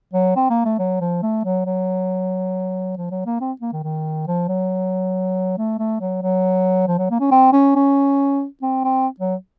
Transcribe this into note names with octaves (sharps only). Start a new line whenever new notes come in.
F#3
C4
A#3
A3
F#3
F3
A3
F#3
F#3
F3
F#3
A#3
C4
A#3
D#3
D#3
F3
F#3
A3
A3
F#3
F#3
F3
F#3
A#3
C#4
C4
C#4
C#4
C4
C4
F#3